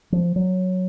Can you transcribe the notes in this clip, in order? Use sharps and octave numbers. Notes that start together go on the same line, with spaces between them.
F3
F#3